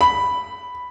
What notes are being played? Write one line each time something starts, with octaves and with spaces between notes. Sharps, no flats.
B5